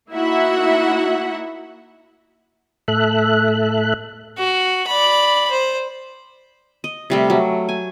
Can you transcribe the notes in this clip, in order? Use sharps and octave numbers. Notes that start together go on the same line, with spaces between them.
A#3 D#4 E4 F#4 E5 F#5
A2 A4 E5 F#6
F#4
D5 B5
C5
D#5
C3 G3 A3
F#3
G#5